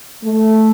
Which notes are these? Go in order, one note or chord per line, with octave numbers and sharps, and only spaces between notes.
A3